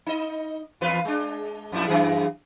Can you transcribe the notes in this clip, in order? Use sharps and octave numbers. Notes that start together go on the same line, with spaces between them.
D#4 D#5
E2 F4 B4
G#3 D4
F2 A#2 E4
F#2 E3 G#4